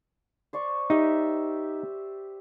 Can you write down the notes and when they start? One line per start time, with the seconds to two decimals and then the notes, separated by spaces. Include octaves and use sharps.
0.53 C5 D5 C#6
0.90 D#4 G4 E5